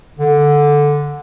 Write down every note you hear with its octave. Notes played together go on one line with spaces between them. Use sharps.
D3